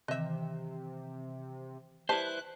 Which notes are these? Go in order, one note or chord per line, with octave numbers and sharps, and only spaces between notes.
C3 D#3 E3 D#5 E5
G3 E4 B4 C5 A5 F#6